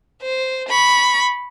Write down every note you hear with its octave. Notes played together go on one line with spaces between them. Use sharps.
C5
B5 C#6